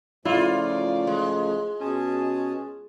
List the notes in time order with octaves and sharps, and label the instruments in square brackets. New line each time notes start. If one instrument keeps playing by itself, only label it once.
[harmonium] C#3 F3 A3 [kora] E4 [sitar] F4 [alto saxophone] D5
[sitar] G#3
[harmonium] B2 G#4 A5 [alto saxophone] C#4